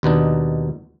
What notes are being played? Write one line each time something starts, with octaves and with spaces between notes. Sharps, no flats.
D#2 B2 D4 D#4